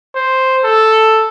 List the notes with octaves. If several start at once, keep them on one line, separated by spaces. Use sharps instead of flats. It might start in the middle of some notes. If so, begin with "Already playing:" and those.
C5
A4